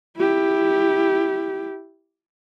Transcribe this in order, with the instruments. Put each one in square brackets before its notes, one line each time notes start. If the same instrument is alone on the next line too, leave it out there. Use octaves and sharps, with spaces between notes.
[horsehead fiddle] E4 G4